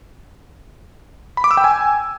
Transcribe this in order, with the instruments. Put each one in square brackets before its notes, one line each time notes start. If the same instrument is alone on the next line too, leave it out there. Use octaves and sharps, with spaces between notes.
[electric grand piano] B5
D6
E6
G5
G#5